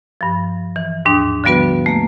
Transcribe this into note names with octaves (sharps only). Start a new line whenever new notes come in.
G2 F3
E3
D#2 G#2 D4 D#6
D3 F3 G3 B3 F#4 B4
A3 A#3